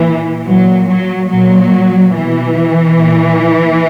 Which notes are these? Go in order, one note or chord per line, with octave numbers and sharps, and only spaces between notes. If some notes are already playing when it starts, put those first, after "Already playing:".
Already playing: A#2 E3
A#2 F#3
F#3
A#2 F#3
B2 E3
A#2